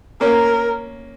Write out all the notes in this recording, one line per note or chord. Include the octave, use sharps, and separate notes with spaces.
A#3 C#4 A#4